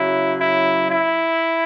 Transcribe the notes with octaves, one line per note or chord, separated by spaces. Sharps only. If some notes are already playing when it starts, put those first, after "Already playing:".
Already playing: C#3 F#3 E4
E4
E4